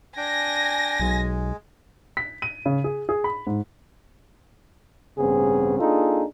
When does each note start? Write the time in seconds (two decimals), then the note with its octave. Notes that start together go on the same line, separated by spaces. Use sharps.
0.17 D4 G5 G#5 A#6
1.00 B1 G#3
2.17 B6
2.42 D#7
2.66 C#3
2.84 G#4
3.09 G#4
3.24 B5
3.47 G#2
5.18 A1 G2 C#3 B3 C4 G#4
5.80 A#3 D4 D#4 F4 G#4 A4